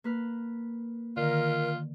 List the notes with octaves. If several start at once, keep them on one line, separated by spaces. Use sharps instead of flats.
A#3 B4 F6
D3 D#3 F4 A#4